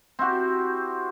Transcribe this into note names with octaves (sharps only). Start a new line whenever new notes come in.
C4 E4 F#4 G4